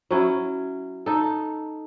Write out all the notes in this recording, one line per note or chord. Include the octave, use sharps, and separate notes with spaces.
F#3 C#4 E4
D#4 A4